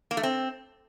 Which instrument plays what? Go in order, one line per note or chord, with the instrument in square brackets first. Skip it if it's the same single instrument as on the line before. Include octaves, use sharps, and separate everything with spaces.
[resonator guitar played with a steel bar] A#3
A3
C4